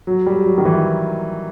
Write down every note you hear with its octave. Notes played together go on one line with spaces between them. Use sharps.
F#3
G3
F#3
D#3
E3